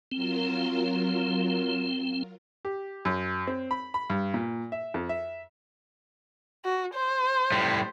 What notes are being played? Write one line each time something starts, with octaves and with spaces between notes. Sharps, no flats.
F#3 C4 F4 A#4
G4
F#2
C4
B5
B5
G2
A#2
E5
F2
E5
F#4
C5
A2 G3